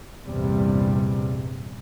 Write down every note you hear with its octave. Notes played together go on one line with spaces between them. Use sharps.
A#1 E2 G2 C3 G3